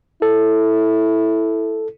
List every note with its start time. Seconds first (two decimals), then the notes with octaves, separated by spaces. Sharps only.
0.22 E4 A4